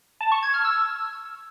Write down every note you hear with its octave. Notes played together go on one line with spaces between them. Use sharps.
A5
C#6
G#6
F6
E6